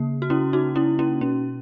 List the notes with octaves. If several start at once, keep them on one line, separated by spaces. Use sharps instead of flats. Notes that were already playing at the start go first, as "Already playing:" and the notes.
Already playing: C#3 A#3
F#4
C#4 E4
D#4 F#4
C#4 E4
C#4 E4
B2 C#4